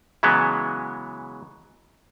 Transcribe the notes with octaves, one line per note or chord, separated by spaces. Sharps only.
C#3 E3 F#3 G#3 B3